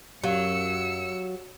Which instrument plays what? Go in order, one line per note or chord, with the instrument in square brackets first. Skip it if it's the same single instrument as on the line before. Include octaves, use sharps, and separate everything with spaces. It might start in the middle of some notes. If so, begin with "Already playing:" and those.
[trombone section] F#2 [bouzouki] F#3 [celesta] G4 F5 [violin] E6 C#7